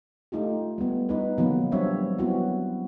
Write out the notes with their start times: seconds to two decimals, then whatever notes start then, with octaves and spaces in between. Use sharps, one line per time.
0.32 A3 D#4 F4 G4
0.78 G3 B3
1.09 D#4 B4
1.38 B2 D#3 F3 F#3 A#3 B3
1.72 F#3 G3 C4 D4 C#5 E5
2.18 F#3 B3 C4 E4 F#4